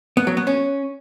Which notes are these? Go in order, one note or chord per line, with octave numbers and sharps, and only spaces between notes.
B3
F#3
B3
C#4